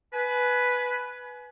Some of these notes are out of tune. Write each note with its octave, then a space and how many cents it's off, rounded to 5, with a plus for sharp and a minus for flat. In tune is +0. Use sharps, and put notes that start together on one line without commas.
B4 +0 G#5 +30